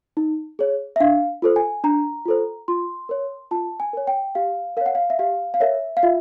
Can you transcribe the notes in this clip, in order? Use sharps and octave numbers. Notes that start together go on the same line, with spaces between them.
D#4
G#4 C#5
E5
D4 F5
F4 A4 C5
G#5
D4 A#5
F4 A4 C5
F4 C6
A#4 C#5
F4 A5
G#5
A#4 C#5
G5
G4 F5
A#4 C#5 F5
F#5
F5
E5
G4 F5
F5
A#4 C#5 E5
F5
F4 E5